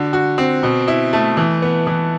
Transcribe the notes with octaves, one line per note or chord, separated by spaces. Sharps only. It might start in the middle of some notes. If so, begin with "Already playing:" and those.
Already playing: D3 F#4
F#4
C4
B2
E4
A3
E3
B3
E3